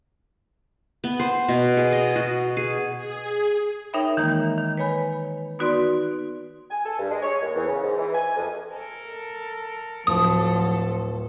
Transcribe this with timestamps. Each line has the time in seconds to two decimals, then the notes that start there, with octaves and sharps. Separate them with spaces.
1.04 B3
1.20 C5
1.48 B2
1.77 G#4
1.92 D#5
2.16 F#4
2.57 G#4
2.95 G#4
3.93 D#4 A#4 C#5 E5 G5 B5
4.17 D#3 E3 G#3 A#3
4.58 D#3
4.77 B4 C#5 G#5 B5
5.59 B3 D#4 F#4 B4 D5 C6
6.71 G#5
6.86 A4
6.99 G2
7.11 G#3
7.23 C#5
7.42 D#2
7.55 E2
7.68 C#3
7.83 G#2
7.98 E3
8.15 G#5
8.36 F2
8.74 A4 A#4
10.07 D1 F3 F#3 A4 D#6